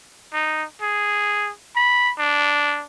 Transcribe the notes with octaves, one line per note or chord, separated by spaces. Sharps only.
D#4
G#4
B5
D4